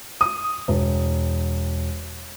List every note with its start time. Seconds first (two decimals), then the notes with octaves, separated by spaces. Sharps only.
0.21 D#6
0.68 E1